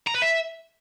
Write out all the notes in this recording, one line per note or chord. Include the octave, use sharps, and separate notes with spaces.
A#5
B4
E5